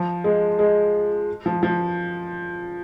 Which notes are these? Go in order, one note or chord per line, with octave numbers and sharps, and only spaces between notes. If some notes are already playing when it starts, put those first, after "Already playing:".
Already playing: F3
G#3
G#3
F3
F3